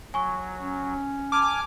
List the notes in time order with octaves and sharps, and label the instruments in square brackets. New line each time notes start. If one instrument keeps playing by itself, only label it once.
[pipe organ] F#3 [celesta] G#5 C#6
[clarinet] C#4
[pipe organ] G#5 F6 [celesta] A5 [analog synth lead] D6